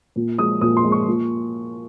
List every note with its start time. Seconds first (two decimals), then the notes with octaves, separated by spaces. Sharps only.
0.16 A#2
0.38 F3 G#3 D#6
0.61 A#2 D#6
0.77 C6
0.84 F3 G#3
0.92 C#6
1.07 A#2